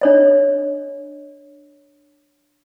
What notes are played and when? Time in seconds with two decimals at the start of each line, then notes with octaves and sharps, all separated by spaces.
0.01 D4 C#5 D#5